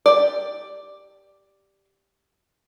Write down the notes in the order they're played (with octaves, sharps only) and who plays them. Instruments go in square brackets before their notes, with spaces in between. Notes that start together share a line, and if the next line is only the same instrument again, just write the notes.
[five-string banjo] G4 D5